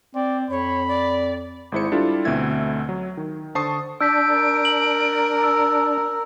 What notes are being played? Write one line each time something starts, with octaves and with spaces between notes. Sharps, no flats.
C4 D5
F2 C#5 B5
D5
G#1 G#3 E4 C5 C#7
G3 D4 E4 F4 A4
D2 B2 A3 C4 E5 G#6
F#3
D#3
D3 C5 A5 C#6 D#6 C7
D4 E6 G6 B6 D7
A#4
F#7
E6